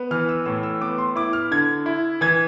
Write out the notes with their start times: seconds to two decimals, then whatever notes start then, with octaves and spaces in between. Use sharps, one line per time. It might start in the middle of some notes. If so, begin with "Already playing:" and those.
Already playing: B3
0.11 E3 F6
0.29 E6
0.45 A2 E6
0.63 E6
0.81 B3 D6
0.98 C6
1.16 E4 D6
1.33 F6
1.51 D3 G#6
1.86 E4
2.21 E3 G#6